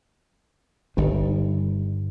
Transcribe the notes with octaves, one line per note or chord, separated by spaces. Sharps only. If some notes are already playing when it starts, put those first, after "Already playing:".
G1 G2 D#3